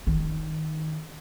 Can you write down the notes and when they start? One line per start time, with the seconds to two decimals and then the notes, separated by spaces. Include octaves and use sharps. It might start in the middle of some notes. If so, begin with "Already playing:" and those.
0.07 D#3